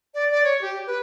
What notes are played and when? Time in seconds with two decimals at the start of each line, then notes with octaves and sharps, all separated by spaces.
0.15 D5
0.31 D5
0.44 C#5
0.62 G4
0.87 B4